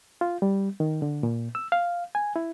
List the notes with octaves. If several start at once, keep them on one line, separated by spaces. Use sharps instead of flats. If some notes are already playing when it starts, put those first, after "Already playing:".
F4
G3
D#3
D3
A#2
E6
F5
G#5
E4